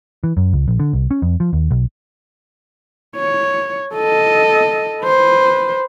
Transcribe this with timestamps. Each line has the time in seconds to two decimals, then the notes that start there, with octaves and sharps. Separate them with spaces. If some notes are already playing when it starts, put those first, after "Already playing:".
0.24 E3
0.37 F#2
0.53 C#2
0.68 A#1
0.80 D3
0.93 C2
1.11 C#4
1.22 F2
1.40 F3
1.53 D#2
1.71 B1
3.16 C#5
3.94 A4 D#5
5.03 B4 C5